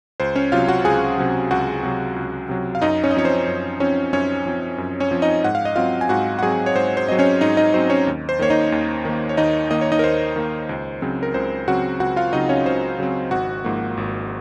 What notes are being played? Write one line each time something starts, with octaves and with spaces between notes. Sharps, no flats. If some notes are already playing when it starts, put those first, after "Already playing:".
C#2 C5
C#4 C#5
C3 F#3 F4 F5
F#4 F#5
C#2 G#4 G#5
C3 F#3
C#2 F#4 F#5
C3 F#3
C#2
C3 F#3
F5
F#2 D#4 D#5
C#4 C#5
D#5
F3 C4 C#5
C5
F#2
F3 C4 C#4 C#5
F#2 C#4 C#5
F3 C4
F#2
C#4 C#5
F3 C4
D#4 D#5
G#2 F#5
F5
D#5
F#3 C4 F4 F5
G#5
G#2 F#4 F#5
F#5
F#3 C4 G#4 G#5
C#5
G#2 C5
C5
F#3 C4 D#5
C#4 C#5
G#2 D#4 D#5
D#4 D#5
F#3 C4 C5
C#4 C#5
D#2
C5
D#3 A#3 C#5
D#4 D#5
D#2
D#3 A#3
C#5
D#2 D#4 D#5
D#3 A#3 D#5
C#5
D#4 D#5
A#4
D#2 C5
D#3 A#3
C#2
C#3 F#3 C4
A#4
C#2 C5
C#3 F#3 C4 F#4 F#5
C#2 F#4 F#5
F4 F5
C#3 F#3 C4 D#4 D#5
C#4 C#5
C#2 C5
C#3 F#3 C4
G#1 F#4 F#5
G#2 F3 A#3
G#1